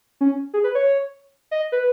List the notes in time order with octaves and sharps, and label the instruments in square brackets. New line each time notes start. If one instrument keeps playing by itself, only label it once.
[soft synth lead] C#4
G#4
B4
C#5
D#5
B4